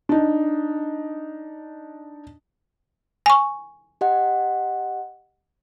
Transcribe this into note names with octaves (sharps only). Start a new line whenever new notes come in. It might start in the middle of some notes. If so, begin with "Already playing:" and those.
D4 D#4
G#5 C#6
G4 D#5 F#5